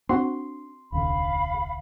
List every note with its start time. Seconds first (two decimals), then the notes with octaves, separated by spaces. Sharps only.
0.09 C4 D4 F#4 C6
0.92 D#1 C2 D3 F5 B5